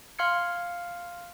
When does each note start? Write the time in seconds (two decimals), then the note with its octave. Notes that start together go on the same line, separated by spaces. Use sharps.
0.19 F5 C6 F6 G#6 C#7